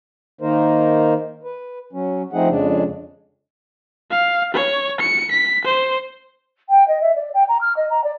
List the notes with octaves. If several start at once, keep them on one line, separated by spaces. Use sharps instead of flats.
D#3 A#3 D#4 A#4 C5
B4
F#3 C#4
F3 A3 C4 D#4 G#4 F#5
F2 C#3 G#3 D4
F5
C#5
C#7
B6
C5
G5
D#5
E5
D5
G5
A#5
F6
D#5
A#5
D5